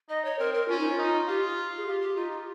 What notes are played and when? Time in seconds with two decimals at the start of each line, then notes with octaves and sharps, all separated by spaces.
0.09 D#4 D#5
0.25 C#5
0.39 C4 A#4
0.54 A#4
0.68 C#4 F4
0.79 D#4
0.89 F4
0.98 D#4
1.27 F4 G4
1.77 G#4
1.86 F4 G4
2.01 G4
2.16 D#4 F4
2.32 F4